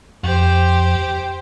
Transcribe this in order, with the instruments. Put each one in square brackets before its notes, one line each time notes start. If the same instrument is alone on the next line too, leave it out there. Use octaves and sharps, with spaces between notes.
[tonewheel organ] F2 [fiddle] G4 C5